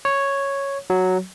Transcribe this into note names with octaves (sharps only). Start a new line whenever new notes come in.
C#5
F#3